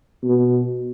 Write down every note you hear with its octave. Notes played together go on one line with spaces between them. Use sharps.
B2